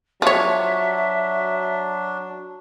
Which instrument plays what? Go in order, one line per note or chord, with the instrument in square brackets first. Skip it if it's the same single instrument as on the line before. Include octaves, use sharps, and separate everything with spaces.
[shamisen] F3 C#5 [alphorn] F#3 [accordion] D4 [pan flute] E5